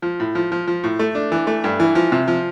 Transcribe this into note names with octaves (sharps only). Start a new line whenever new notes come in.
F3
A2
F3
F3
F3
A2
A3
D4
E3
A3
G2
E3
F3
C3
F3